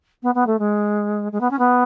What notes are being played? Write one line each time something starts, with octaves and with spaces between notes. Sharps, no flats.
B3
B3
A3
G#3
G#3
B3
C#4
B3